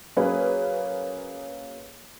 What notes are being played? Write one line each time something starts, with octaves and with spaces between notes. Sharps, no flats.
F#3 A#3 C#4 G#4 B4 C#5